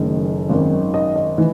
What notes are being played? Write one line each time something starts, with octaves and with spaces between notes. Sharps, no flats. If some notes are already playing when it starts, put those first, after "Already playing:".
Already playing: F#1 F#2 D#3 A3
G#1 F#2 D#3
D#5
D#5
E3